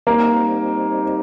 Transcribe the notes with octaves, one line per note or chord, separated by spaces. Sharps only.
G3 A#3 C4 D#4